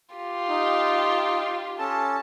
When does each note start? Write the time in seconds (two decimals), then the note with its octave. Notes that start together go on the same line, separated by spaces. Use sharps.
0.15 F4 G4
0.48 D#4
1.79 C#4 A4 A5